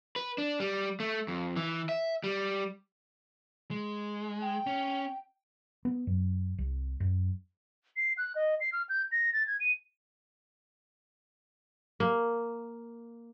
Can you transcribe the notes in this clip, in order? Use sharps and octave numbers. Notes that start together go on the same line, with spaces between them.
B4
D4
G3
A3
F2
E3
E5
G3
G#3
G5
C#4
B3
F#2
C2
F#2
C7
F#6
D#5
C7
F6
G6
A#6
A6
G#6
D#7
A#3